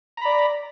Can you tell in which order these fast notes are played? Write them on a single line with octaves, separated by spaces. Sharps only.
A#5 B5 D5